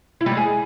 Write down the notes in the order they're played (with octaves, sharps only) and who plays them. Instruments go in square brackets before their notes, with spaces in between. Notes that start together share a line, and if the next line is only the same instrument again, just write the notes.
[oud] E4
G3
G#3
G#4